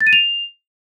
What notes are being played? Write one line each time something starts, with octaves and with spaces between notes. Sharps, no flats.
A6
D#7
F7